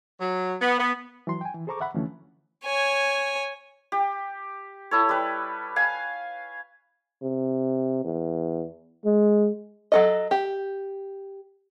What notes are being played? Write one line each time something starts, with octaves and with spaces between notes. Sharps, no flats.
F#3
B3
B3
E3 F#3 C6
G5 G#5
E3
G#4 A4 C5 A#5 C#6 D6
E5 F#5 B5
D2 E3 F3 A3 C#4
C#5 G#5
G4
E4 A4 C#5
G3 B4
F5 G#5
C3
E2
G#3
F#3 A4 D#5
G4